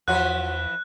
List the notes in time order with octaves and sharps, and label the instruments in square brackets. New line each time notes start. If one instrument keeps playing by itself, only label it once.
[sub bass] E2 [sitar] E3 F3 B4 [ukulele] F4 F#4 C#5 [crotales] F#6